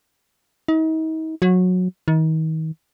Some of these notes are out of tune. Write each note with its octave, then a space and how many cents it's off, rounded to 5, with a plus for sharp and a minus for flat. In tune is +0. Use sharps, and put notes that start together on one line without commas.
D#4 +40
F#3 -20
D#3 +35